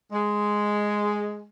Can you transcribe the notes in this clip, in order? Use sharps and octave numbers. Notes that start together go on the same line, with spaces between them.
G#3